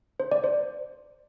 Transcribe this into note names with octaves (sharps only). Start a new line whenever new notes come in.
C5
D5
C5